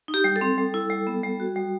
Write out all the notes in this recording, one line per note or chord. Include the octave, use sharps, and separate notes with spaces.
D#4
G4
G3
A4
C4
G3
E4
G3
B3
G3
F#4
G3